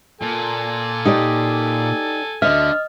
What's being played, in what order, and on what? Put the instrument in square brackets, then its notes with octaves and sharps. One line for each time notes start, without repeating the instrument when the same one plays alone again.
[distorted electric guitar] A#2 [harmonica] A4 G#5
[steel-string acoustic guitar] D#4 G4 D5
[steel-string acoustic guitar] D2 E5 [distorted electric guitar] D3 [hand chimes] D#5 F6